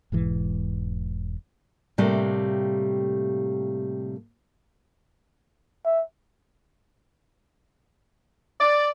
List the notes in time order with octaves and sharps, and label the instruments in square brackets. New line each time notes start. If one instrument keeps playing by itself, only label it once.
[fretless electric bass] E1 G#2 E3
[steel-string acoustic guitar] A2 C3 G3 A3 A#3
[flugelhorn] E5
[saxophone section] D5